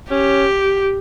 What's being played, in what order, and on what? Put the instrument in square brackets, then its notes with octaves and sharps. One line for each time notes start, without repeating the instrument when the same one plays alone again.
[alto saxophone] C#4 [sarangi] G4